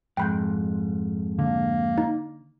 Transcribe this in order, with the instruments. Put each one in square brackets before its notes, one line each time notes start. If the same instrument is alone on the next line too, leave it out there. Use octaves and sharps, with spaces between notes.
[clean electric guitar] F2 G#2 [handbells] G5 B5 G6
[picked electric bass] D3 [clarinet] A#3
[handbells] D#4